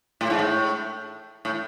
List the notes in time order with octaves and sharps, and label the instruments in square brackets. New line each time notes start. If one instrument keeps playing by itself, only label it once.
[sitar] A2
G#2
A2
A2